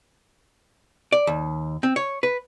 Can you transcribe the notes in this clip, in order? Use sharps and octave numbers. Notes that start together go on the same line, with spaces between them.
D5
D#2
C4
C#5
B4